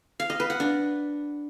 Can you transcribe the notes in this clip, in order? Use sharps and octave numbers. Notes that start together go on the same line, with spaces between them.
F5
D#5
B4
F#5
D4